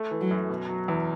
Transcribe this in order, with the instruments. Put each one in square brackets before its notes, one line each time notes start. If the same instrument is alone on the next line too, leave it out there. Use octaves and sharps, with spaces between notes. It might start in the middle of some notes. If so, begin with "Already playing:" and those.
Already playing: [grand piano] A3
E3
[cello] F#3
[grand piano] F#2
B2
F#3
E2